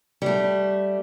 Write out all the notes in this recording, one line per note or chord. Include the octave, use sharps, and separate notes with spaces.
G3 A3